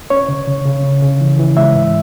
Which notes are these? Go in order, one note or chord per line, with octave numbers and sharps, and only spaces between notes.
C#4 C#5
C#3
C#3
C#3
C#3
C#3
E3
E3
G#3 E5
G#2